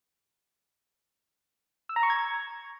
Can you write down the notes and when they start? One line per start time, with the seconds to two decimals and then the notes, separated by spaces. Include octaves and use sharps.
1.89 E6
1.96 A#5
2.03 C#6
2.10 G#6